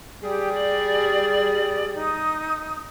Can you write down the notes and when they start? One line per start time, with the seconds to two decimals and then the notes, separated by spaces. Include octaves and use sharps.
0.23 G3 G4 G#4
0.53 D5
1.95 D#4 D#6